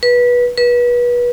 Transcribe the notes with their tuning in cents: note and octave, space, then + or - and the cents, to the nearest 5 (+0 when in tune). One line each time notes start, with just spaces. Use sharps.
B4 -20
B4 -30